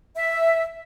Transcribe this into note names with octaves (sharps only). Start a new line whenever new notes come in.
E5